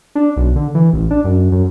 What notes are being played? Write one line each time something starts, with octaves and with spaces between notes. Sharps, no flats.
D4
B1
D3
E3
A1
D4
F#2
F#2